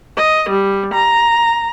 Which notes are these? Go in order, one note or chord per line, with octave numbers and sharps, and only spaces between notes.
D#5
G3
A#5